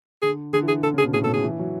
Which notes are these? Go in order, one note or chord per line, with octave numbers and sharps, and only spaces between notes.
D3 G#4
D3 G#4
E3
G#4
D3 A4
C#3
G#4
B2
A2 G#4
B2 A4
A2 G#4
E3
F#3